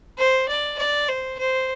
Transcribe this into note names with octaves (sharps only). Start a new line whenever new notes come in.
C5
D5
D5
C5
C5